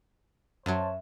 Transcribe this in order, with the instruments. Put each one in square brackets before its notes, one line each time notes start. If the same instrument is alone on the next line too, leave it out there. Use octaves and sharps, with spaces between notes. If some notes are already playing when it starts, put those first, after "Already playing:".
[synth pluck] F#2 F#3 [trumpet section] C5 C#5 A5 [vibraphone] E5